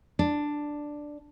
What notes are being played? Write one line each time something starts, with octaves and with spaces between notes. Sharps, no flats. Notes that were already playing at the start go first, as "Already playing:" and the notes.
D4